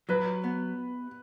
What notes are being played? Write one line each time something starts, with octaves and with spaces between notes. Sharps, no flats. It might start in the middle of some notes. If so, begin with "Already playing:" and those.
F#3 B4
B3